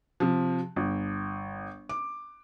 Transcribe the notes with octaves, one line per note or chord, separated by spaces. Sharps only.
C3 F3
G1
D6